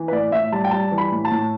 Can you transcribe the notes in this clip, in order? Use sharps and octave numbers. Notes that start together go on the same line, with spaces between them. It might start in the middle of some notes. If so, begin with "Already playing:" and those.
Already playing: E3
B4
A2 D5
A2 E5
G3 A5
G5
G3 A5
E3
B5
A2
A5
A2